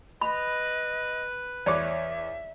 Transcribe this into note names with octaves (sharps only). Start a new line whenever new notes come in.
B4 D#5 B5
E2 C#5 D5 E5 D6